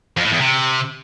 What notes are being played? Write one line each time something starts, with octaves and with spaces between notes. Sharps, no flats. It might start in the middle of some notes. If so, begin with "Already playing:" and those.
F2
A2
E2
C3